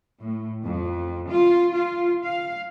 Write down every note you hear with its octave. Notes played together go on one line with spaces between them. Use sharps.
A2
F2
F4
F4
F5